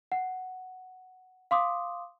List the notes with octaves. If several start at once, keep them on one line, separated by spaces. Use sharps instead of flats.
F#5
F5 C6 D6 D#6